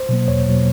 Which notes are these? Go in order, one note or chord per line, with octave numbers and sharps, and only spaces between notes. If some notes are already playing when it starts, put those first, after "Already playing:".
Already playing: C5
B2 F#3 A#3
E2 C#5
B2 F#3 A#3